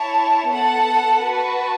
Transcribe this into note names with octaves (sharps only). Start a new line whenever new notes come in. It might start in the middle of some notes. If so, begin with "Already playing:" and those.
Already playing: E4 C#5 A5
B3 A4 F#5 A5
F#4 B4 A5